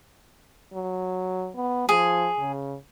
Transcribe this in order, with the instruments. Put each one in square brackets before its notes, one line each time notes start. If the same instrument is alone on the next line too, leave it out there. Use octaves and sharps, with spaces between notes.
[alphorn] F#3
B3
[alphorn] F3 [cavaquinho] G#4
[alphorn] C#3